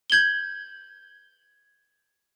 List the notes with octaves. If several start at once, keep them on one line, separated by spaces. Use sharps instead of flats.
G6 G#6 F#7 G7